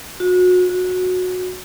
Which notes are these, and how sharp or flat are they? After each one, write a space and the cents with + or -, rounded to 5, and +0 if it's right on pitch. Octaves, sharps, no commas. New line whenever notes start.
F#4 -30
F#4 -15